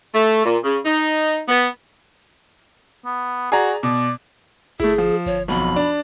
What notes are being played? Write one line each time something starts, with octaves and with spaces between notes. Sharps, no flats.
A3
A#2
C#3
D#4
B3
B3
F#4 G#4 D5 A#5
B2 D5
G1 A3 E4 G#4
F3
G1 C#5
B1 F2 B5
D4